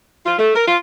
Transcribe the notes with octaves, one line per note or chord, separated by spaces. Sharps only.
F4
A3
A#4
F4